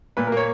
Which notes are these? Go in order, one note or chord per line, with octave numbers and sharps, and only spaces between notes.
A#2 B4
A#4
A#3 C#5